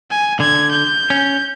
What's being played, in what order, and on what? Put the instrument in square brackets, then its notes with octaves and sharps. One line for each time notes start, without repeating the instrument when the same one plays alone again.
[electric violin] G#5
[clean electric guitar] D3 [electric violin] G#6
[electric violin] G6
[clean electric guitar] C#4